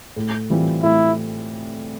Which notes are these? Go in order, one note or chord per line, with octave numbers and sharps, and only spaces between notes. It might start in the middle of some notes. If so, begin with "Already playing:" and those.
A2
E3 G3 C4 F4
A2 E4